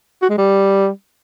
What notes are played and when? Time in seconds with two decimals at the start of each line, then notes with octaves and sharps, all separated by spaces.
0.22 F#4
0.30 G#3
0.38 G3